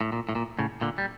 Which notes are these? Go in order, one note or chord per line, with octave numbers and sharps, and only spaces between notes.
A2
A#2
A2
A#2
A2 C#3
A#2 D3
G3